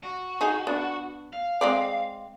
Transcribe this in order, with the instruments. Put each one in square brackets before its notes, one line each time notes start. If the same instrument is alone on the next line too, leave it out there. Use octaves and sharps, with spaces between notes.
[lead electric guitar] F#4
[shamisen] D#4 G#4
B3 D4
[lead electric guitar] F5
[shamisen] G#3 C4 D5